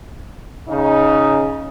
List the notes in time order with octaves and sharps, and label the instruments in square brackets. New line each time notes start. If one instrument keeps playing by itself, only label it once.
[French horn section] C#3 D#4